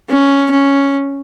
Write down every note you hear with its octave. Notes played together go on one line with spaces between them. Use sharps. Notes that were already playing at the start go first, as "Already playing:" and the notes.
C#4
C#4